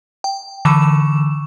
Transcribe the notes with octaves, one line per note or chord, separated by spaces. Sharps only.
G5
D3 E3 C#6 E7